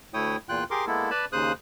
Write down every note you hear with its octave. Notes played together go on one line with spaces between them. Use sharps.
D2 A3 E4 C#5 G5 D#6
E2 A#2 F4 G5 F#6
G4 G#4 A#4 C6 D6
G#3 A#3 B3 E4 A4
B4 D5 A5 B5
D#2 C#3 C5 D#6 F#6